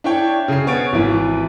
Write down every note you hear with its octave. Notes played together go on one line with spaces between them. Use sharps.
D4 E4 C#5 G5
C#3 C7
B3 C#5 A6 D7
G#1 E3